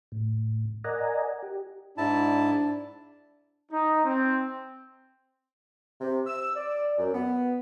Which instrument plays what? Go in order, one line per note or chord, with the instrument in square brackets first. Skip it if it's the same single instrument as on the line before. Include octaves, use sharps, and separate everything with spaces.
[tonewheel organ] A2
A#4 D5 D#5 F#5 G#5 A#5
G4
[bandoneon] G#2 E4 A5 [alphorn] D4
[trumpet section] D#4
C4
[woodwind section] C3
E6
D5
F#2
B3